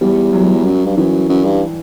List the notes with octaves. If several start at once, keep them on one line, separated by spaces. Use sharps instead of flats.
E2 G3
F#3
G3
F#3
F#2
G2
F#2 E3
F#2
G2